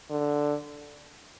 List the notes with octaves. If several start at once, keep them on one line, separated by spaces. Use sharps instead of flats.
D3